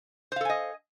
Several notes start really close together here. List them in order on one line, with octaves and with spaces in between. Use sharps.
C5 F5 A4 G#5 D#5